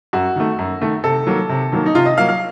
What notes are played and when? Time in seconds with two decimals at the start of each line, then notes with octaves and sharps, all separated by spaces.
0.13 F#2 F#4
0.36 D#3 A3
0.59 F#2
0.82 D#3 A3
1.04 C3 A4
1.27 D#3 F#3 A#3
1.49 C3
1.72 D#3 F#3 A#3
1.86 D#4
1.94 C3 F4
2.05 D#5
2.17 F#3 A#3 F5
2.29 F5